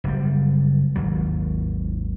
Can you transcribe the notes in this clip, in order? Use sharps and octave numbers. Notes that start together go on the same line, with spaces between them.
F#1 G3
G#1 D#2 F#3